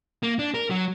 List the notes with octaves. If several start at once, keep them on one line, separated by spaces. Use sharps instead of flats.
A#3
D4
A#4
F#3